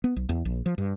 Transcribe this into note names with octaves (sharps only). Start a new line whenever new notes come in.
B3
B1
E2
A#1
F3
G2